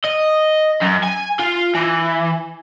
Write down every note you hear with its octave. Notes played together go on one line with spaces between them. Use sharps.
D#5
F#2
G#5
F4
E3